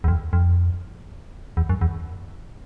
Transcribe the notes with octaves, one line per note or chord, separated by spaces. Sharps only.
E2
F2
F2
E2
F#2
E2